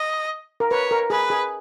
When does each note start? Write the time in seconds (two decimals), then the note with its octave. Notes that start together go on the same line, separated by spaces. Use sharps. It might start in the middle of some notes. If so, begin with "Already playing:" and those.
Already playing: D#5
0.60 A#4
0.71 B4 C#5
0.91 A#4
1.10 G#4 B4
1.30 G#4